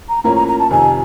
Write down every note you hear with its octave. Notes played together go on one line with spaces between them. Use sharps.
A#5
A2 F3 A#3 C#4 A#5
A#5
A#5
A5
F2 C3 D#3 G#5